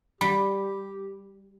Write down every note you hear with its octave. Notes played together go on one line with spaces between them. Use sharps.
G3 G4 B5